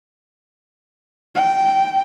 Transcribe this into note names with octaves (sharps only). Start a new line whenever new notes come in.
G5